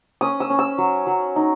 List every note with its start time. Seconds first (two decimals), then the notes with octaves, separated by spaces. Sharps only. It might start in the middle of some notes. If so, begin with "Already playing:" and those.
0.21 C#4 D#6
0.40 E6
0.50 C#4
0.59 E6
0.78 F#3
1.07 F#3
1.36 D#4